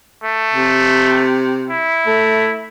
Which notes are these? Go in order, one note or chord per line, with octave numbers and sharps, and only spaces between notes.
A3
C3
E4
A3